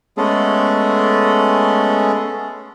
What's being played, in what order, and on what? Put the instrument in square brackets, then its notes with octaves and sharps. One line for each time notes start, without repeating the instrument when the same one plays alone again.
[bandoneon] G#3 A3 B3 C#4 G#4 A4